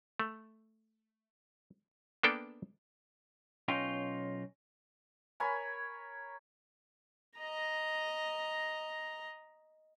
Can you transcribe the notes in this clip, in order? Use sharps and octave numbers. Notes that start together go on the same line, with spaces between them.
A3
A#3 B3 D4 A4 G5
B1 C#4 D#4 F4 G5 A#5
A#4 C#5 G#5 B5
D#5 A#5